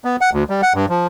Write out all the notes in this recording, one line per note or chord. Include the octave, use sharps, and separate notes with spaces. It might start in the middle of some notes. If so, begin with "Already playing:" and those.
B3
F#5
D2
G3
F#5
G2
F3